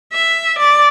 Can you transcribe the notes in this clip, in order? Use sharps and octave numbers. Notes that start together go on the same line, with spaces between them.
E5
D5